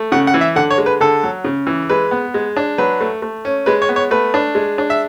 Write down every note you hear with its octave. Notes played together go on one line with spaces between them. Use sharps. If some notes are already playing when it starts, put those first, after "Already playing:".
Already playing: A3
C#3 F#5
F#5
E3
E5
D3 F#5
C#5
G#3
B4
D3 A4
F#3
C#3
E3
G#3 B4
B3
G#3
D4
F#3 B4
A3
A3
C#4
G#3 B4
C#5
B3
C#5
A3 B4
D4
G#3
D4
E5